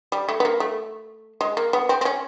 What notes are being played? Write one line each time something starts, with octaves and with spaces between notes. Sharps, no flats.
G3
A3
B3
A#3
A3
G#3
A#3
B3
C4
C4
C#4